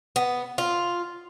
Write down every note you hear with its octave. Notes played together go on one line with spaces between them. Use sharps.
B3
F4